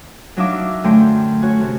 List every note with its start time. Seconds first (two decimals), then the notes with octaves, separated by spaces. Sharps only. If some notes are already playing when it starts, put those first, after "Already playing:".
0.37 F#3 D4 D#4 E5 F5 D6
0.84 F#2 D3 A3 G5 C6
1.42 C#4 F#4 C#5
1.60 C3 A3